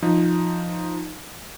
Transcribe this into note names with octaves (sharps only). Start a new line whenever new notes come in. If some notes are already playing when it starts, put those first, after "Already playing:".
F3 D#4